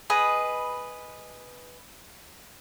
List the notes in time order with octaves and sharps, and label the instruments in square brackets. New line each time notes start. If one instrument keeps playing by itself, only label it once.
[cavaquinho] G#4 B4 D#5 B5